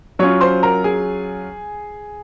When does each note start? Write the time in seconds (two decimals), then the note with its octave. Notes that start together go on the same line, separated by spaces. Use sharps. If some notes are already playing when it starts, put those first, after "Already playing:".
0.19 F#3 C#4 F4 C#5 C#6
0.41 C5 C6
0.63 A#4 A#5
0.84 G#4 G#5